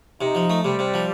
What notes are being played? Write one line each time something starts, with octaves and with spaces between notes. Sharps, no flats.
C3 D#4
F3
A3
C3 G3
C3
F3